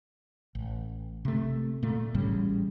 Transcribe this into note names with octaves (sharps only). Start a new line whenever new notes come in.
A1
C3 A3
A#2 A3
A1 A2 C#3 G3